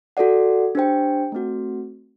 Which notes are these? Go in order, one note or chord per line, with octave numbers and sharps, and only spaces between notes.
F#4 A4 D5 F#5
D4 G4 C5 G5
A3 C4 F#4